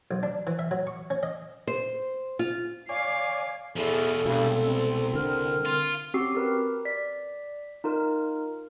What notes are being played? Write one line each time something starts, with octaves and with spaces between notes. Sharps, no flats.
B1
D4
E3
E5
F#3
C#6
C#4
D#5
C5
F4
C#5 D5 F5 G#5
E2 B2 F3 A4
C2 G2 B2 G#3
C4
D3 A#4 F6
F4
C4 C#4 F#4 G4 E6 C7
G4 A#4 B4
D5 B6
D#4 F4 A#4